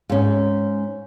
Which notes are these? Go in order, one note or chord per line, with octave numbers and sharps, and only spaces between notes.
G#2 C#4